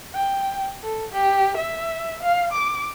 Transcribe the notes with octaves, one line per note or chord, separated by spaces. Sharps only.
G5
A4
G4
E5
F5
D6